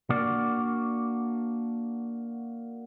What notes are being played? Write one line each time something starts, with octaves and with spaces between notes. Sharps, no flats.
A#3 D4 F#4 D5